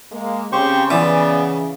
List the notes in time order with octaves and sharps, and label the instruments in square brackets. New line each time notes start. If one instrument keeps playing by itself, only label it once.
[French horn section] G#3 A#3
[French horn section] C#3 [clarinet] C4 [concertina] G4 C5 C#6
[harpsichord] E3 [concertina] B3 [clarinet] D5